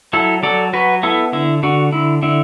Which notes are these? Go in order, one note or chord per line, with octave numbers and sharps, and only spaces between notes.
F#3 E4 A4
F#3 A4 D5
F#3 F#4 B4
B3 E4 A4
D3 E4
D3 F#4
D3 E4
D3 E4